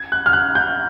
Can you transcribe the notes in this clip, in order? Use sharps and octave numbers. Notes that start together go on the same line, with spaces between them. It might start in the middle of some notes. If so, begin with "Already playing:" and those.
Already playing: G#6
F#6
F6
F#6
G6